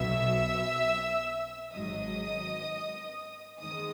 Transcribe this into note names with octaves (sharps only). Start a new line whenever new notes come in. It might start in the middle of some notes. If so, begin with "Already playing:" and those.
Already playing: B1 B2 F#3 E5 E6
G#1 G#2 F#3 D#5 D#6
D#2 D#3 G#3 D#5 D#6